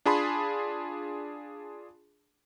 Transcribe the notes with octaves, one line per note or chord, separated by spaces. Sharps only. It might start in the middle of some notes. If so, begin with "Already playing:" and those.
D4 F4 G#4 A5 B5 C6